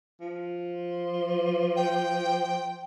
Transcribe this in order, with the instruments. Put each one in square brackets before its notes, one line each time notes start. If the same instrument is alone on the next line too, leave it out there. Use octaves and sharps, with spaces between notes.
[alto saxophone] F3
[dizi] G5